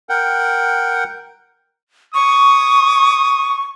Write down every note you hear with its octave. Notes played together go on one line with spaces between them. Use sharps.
A#4 F#5 G5
C#6 D#6